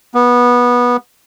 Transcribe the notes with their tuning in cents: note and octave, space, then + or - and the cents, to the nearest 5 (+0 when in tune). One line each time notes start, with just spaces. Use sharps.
B3 -15